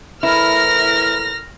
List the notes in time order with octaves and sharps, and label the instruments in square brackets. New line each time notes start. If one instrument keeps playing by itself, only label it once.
[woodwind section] A2 E3 A#4 [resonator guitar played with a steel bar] E4 [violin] F6 A#6